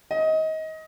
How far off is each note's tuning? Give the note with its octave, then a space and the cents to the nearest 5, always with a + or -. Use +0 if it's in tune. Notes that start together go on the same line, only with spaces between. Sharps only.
D#5 +25